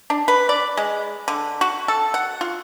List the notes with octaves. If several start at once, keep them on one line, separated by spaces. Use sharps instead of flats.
D4
B4
D5
G#3
D3
F#4
A4
F#5
F4